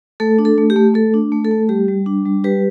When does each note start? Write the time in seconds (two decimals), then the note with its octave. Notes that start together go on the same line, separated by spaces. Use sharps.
0.20 A3 A4
0.39 D4
0.45 A4
0.58 A3
0.70 G4
0.76 A3
0.94 A3 A4
1.14 D4
1.32 A3
1.45 A4
1.51 A3
1.69 G3 G4
1.88 G3
2.06 D4
2.26 G3
2.44 G3 G4 B4